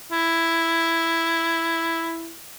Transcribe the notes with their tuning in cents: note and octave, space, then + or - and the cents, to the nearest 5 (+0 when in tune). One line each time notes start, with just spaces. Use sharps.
E4 +5